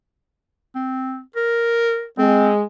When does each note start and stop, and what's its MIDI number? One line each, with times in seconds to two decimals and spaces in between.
0.75 1.20 60
1.36 2.05 70
2.18 2.62 56
2.18 2.49 60